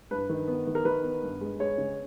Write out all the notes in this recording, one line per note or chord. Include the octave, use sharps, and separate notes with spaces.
G2 B4
D#3
B3
D#3
A#4
D#3 B4
B3
G2
G#3
G#3 C#5
C#3